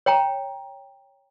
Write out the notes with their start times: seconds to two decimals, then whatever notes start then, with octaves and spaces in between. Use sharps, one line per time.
0.06 C#5 G5 A#5